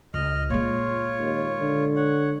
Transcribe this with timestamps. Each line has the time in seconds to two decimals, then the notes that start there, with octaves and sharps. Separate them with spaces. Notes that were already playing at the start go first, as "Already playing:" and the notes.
0.14 C#2 D#5 F6
0.50 A#2 G#3 F4 C#5
1.20 D#2
1.61 D3
1.96 C#5 F#5